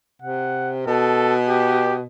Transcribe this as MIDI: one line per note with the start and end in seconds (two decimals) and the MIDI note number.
0.22 0.85 48
0.22 0.71 78
0.87 2.04 47
0.87 1.35 69
1.48 1.94 67